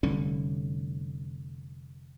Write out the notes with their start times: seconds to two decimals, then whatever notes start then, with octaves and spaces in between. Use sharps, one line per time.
0.03 F1 D3 G3 C#4